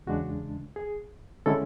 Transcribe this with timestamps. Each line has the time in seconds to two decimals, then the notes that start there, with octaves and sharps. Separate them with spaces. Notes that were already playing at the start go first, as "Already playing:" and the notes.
0.07 E2 C#3 G#3 D4 F#4
0.76 G#4
1.46 D3 G#3 C#4 E4 A4